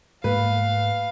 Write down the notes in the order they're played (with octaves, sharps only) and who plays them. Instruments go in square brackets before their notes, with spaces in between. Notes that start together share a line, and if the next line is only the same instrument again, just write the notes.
[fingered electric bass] G#2 A3 A#3 [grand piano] B4 [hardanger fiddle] F5